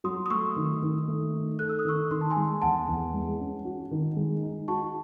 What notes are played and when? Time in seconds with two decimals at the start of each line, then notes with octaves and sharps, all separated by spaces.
0.04 F#3 C6 D#6
0.26 D#6
0.30 A3 C#6 E6
0.56 D#3
0.82 D#3
1.08 A3
1.33 D#4
1.59 A4 F#6
1.69 E6
1.79 D#6
1.85 D#3 C#6 E6
2.10 D#3 C6
2.21 A5
2.30 G#5 C6
2.36 G#3
2.62 E2 F#5 A5
2.88 E2
3.14 G#3
3.40 C#4
3.65 F#4
3.91 D#3
4.16 G#3
4.43 D#4
4.68 F#4 A5 C#6